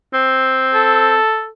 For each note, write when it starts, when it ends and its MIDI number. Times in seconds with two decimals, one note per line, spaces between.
0.14 1.17 60
0.75 1.48 69